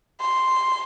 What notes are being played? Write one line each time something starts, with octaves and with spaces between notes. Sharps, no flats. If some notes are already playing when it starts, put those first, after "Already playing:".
C6